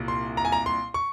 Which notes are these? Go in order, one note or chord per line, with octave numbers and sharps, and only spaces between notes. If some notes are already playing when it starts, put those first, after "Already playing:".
Already playing: C2 A#2
C6
A#5
G#5
A#5
C6
C#6